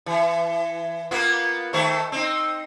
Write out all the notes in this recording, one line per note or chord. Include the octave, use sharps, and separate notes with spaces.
E3
A#3 B3 F4
D#3 A3 C5
C4 D#4